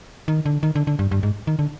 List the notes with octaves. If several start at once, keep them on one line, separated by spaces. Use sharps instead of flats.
D#3
D3
D#3
D3
D3
G2
G2
G#2
D#3
D3